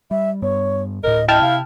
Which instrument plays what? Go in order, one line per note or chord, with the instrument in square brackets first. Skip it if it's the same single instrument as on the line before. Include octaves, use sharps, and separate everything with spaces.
[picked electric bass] G3 [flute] E5
[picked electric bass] G2 G3 B3 [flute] C#5
[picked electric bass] D1 A2 [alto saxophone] A#4 [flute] D#5
[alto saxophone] E4 [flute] D#5 [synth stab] G5 A5 F6
[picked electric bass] C3 [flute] F5